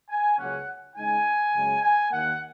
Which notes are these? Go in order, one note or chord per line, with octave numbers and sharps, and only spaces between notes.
G#5
C#2 C#3 F#3 A#3 C#4 F#5
C#3 G#3 D#4 G#5
F#2 C#3 G#3
G#5
D#2 D#3 A#3 F#5